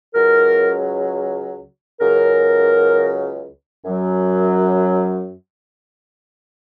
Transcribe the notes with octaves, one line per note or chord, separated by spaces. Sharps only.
C#2 C#3 F#3 A#4
C#2 C#3 F#3 A#4
F#2 F#3